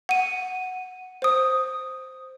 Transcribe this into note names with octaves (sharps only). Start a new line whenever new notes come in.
F#5 D#7
C5 D#6